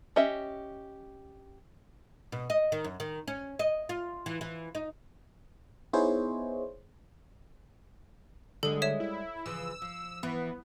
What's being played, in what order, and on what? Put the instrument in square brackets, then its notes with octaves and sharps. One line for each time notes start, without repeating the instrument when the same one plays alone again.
[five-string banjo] C#4 G4 D#5 E5
[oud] B2
D#5
D#3
F#2
D#3
C#4
D#5
F4
E3
E3
D#4
[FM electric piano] B3 D#4 E4 G#4 C5 C#5
[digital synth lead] D3 [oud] G3 G#3 [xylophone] A4
[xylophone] C#5 E5 E7
[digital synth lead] E4
[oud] C#3 E3 F3 [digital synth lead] E6
[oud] F3
[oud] E3 [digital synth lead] B3